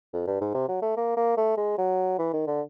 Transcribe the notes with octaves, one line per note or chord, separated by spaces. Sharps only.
F2
G2
G#2
C3
F#3
A3
A#3
A#3
A3
G#3
F#3
E3
D#3
D3